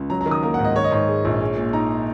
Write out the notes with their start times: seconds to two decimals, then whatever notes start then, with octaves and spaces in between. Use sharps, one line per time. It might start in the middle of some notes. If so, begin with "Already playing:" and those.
Already playing: C#2
0.10 F#3 A#5
0.21 A#5
0.26 D#3
0.31 D#6
0.43 A#3 A#5
0.54 F#5
0.59 G#2
0.64 D#5
0.76 D#3 C#5
0.84 D#5
0.91 G#2 C#5
1.08 G#3
1.25 A#1
1.41 G#3
1.57 A#2
1.73 D#4 A#5